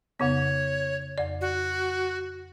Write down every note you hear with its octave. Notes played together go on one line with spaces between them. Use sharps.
F2 C#3 B3 C#5
F2 D5
F#4